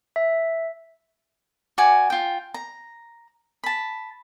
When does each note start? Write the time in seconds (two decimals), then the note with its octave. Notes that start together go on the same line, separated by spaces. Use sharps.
0.16 E5
1.78 F#4 D5 G#5
2.10 F4 G5
2.54 A#5
3.64 A5 B5